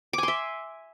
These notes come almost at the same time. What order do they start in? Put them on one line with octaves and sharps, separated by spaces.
D6 G#5 C6 E5